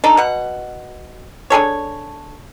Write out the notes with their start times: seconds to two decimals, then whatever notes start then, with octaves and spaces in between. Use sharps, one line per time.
0.04 D4 D#4 A4
0.17 B2 F#5
1.50 D4 G#4 A4 C#5